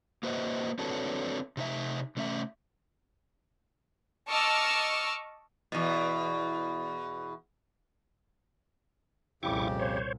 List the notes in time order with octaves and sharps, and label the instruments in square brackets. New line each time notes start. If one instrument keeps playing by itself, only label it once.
[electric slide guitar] A#3 F#4 B4 C5 D#5 E5
C4 D4 F#4 A4 B4 C#5
C3 D#4 E5
C3 A3 C#4 C#5 E5
[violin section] D#5 A5 C#6 D6 E6 F6
[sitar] E2 B2
[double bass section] C2 A#2 [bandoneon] F2 C#3 G4 [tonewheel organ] E4 C#6 D6
[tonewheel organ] C5 C#5